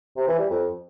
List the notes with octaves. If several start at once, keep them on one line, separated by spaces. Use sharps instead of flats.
C3
E3
G3
F2